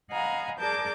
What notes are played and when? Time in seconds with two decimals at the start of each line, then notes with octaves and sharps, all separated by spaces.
0.10 D#5 F5 F#5 G#5 A#5 B5
0.58 G#4 A#4 D5 A5 D6 G6